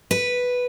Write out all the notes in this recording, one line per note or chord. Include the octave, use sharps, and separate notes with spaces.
B4